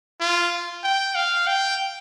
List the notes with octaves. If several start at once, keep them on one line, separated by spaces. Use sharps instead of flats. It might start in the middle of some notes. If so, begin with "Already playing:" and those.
F4
G5
F5
G5